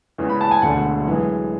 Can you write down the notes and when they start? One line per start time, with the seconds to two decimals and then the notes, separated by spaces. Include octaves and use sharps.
0.18 E2 C#3 E3 G#3
0.29 B5
0.41 A5
0.51 G#5
0.62 E1 D2 D3 A3 F#5
1.05 F#2 E3 G#3